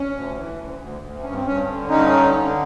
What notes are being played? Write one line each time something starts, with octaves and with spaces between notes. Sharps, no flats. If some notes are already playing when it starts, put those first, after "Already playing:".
Already playing: C#4
D2
E3
D2
D2
D2
G2 C#4
C4
G2 C#4
D3
G2 C#4 D#4
D3
D3